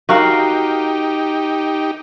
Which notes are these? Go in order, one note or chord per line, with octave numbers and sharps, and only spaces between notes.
D#4 F#4 G4 A#4 F5